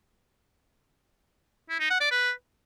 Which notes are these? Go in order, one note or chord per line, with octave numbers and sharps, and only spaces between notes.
E4
D#4
F#5
D5
B4